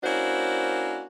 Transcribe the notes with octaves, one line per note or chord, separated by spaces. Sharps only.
A#3 C#4 D4 E4 F#4 C5